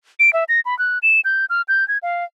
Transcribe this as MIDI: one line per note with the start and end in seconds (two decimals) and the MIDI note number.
0.20 0.33 98
0.33 0.44 76
0.49 0.60 94
0.65 0.77 83
0.79 0.99 90
1.03 1.20 100
1.25 1.45 91
1.50 1.62 89
1.68 1.87 91
1.88 1.98 92
2.03 2.24 77